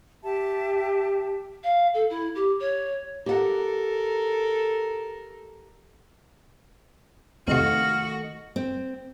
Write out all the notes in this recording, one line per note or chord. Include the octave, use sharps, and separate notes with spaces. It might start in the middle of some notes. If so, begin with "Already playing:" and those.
G4 E5 A5
F5
A4
E4
G4
C#5
G4 A4 A#4 F#5
F2 C3 D#3 A3 F#4 D#5 F5
C4